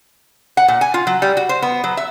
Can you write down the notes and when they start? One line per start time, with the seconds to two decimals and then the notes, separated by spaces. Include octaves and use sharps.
0.57 F#5
0.68 A#2
0.81 G#5
0.94 F4
1.07 F#3
1.22 G3
1.37 F#4
1.49 C5
1.62 B3
1.84 F#3
1.97 E5